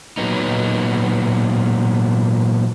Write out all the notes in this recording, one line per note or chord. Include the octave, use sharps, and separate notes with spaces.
A#2 F#3 B3 D#4